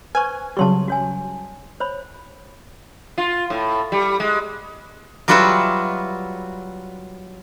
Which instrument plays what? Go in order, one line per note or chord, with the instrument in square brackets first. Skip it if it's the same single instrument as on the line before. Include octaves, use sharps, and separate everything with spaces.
[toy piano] B4 C5 C#6 [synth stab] G#5
[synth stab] C#3 F#3 G3 [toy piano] A5 C6 C#6
[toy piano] F#4 C#5 G#5
C5 C#5 B5
[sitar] F4
A2
G3
G#3
[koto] F#3 G3 F4 F#4 B4 E5